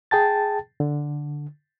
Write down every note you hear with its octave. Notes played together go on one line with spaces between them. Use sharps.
G#4 G5 A5 A6
D3